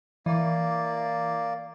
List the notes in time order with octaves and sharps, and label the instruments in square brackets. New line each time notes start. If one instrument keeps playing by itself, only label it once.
[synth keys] E3 [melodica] A#3 D5